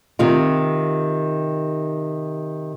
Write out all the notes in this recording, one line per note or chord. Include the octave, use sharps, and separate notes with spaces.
C3 D#3 F4